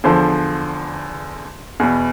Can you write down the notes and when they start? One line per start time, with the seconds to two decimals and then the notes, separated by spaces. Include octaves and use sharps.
0.04 E2 D3 F3 C5
1.80 E2 B2